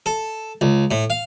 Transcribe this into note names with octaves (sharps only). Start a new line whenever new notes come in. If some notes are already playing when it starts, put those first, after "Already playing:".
A4
C#2
A2
F5